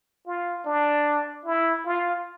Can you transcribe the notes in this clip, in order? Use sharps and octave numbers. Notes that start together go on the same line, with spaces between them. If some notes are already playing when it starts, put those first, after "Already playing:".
F4
D4
E4
F4